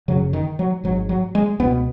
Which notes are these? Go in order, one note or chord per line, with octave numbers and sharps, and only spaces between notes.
F#1 F#2 C#3 F#3
D#3
F#3
G#1 F#3
G#2
F#3
G#3
C#2 B2 B3